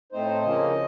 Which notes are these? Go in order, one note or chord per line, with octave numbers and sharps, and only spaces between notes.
A2 A3 C4 D#4 C5
C#3 F3 A#3 C#4 D#5